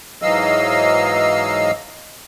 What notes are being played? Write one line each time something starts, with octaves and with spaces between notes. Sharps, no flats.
G#2 E3 F#3 D#5 F5 E6